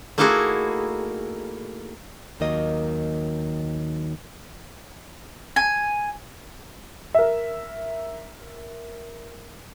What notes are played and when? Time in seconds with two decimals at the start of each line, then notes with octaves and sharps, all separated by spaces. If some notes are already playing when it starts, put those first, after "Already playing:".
0.18 A3 A#3 D#4 E4 F#4 G#4
2.40 D#2 D#3 F#3 A#3 D#5
5.56 G#5
7.15 A#4 E5